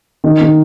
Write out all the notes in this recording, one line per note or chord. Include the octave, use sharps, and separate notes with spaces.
D#3
D#3